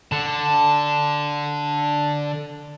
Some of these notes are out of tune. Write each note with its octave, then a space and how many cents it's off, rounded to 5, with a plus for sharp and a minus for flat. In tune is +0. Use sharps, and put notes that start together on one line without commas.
D3 +0 A5 +0